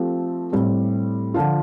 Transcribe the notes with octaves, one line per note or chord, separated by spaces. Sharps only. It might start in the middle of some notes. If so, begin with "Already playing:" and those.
Already playing: F3 A3 C4 G4
A2 G3 C4
D3 F3 D4 F4